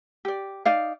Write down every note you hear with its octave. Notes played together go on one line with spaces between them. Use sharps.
G4 D5
D#4 D5 F5